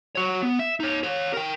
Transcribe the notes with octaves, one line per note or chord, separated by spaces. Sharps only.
F#4 C#5
B3
E5
D#4 C#5
G4 C#5
A#4 G5